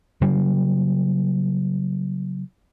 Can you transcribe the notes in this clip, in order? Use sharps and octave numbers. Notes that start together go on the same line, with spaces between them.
C#3 F#3 G3 A#3